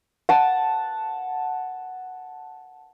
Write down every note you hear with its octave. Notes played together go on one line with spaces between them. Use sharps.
F#5 A5